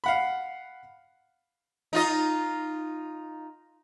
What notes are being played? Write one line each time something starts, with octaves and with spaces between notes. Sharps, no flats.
F5 F#5 B5
D#4 F4 D#5